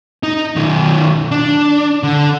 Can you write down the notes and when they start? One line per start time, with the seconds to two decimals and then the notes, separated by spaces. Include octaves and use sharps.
0.23 D#4
0.56 B1 D#3
1.31 D4
2.03 D3